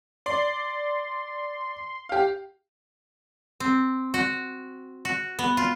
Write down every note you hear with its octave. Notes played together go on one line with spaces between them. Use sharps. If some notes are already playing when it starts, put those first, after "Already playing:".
D5 C6
G4 F5
C4
F#4
F#4
B3
F4